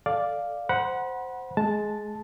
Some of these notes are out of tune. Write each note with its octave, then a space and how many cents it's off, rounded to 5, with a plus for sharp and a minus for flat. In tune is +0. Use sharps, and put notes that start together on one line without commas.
A4 +0 D5 +0 F5 +0
C5 -5 F#5 +0 B5 -35
G#3 +15 A5 +0